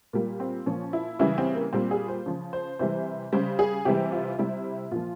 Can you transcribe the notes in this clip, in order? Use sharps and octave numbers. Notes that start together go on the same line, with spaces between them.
A#2 G3 A#3
C4
A#2 F3 C#4
E4
C#3 E3 G3 E4
C4
A#3
A#2 G3 C4
G#4
C5
C#3 F3
C5
C3 E3 G3 C5
C#3 G3 C5
G#4
C3 E3 G3 G4
F4
C3 G3 E4
A#2 F3 F4